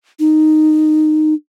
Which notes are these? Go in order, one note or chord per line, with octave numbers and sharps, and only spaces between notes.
D#4